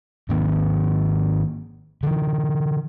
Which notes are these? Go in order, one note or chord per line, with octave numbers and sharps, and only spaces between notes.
G#2 D#3 A#3 C4
D3 E3